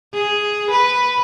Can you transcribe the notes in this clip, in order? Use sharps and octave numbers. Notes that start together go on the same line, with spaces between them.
G#4
B4